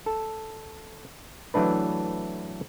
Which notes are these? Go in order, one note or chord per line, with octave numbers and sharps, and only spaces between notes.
A4
E3 F#3 A3 D4 B4